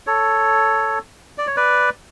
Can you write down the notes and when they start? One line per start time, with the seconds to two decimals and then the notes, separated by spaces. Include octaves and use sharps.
0.07 A4 C#5
1.38 D5
1.47 C#5
1.57 B4 D5